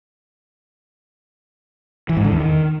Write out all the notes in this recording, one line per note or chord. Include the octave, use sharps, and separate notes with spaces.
E3
G#2
D3
E2
D#3